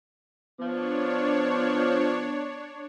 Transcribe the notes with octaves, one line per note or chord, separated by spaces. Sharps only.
F3 B3 D4 C#5